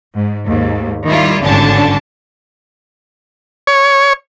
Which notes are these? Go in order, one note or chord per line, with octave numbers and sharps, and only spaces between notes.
G#2
D#2 G#2
D#3 G3 E4 F4
G#1 G2 D3 C#4 D4 A5
C#5